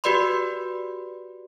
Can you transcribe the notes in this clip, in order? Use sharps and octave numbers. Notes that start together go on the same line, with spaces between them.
F#4 G4 B4 D5 B5 C6